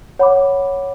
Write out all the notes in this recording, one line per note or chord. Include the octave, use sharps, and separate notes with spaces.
C#5 F#5 B5 D6